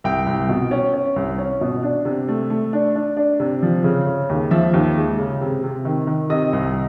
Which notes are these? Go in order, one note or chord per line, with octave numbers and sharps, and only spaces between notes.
C2 G5
C2
B2
C#4
C#4
C2
C#4
B2
D4
C3
A3
A3
D4
D4
D4
C3
F3
C#3
C#3
D#2
F3 E5
D#2
G#3
C#3
C3
C3
D#3
D#3
C3 D#5
C2